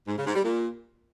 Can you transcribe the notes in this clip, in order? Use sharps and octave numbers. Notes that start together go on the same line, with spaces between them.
G#2
C#3
G#2
G3
A#2